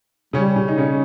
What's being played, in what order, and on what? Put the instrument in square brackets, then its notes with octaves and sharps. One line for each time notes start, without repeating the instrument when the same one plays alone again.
[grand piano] C#3 C#4 [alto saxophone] G3
[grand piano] C#3 C#4
D#4
C#3 C#4